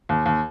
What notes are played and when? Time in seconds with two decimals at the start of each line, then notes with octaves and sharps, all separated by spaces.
0.09 D#2
0.26 D#2